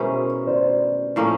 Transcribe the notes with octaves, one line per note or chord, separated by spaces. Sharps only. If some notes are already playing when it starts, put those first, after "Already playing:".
Already playing: B2 G#3 C#4 E4 A#4 C5
C5 D5
A2 F3 A#3 C#4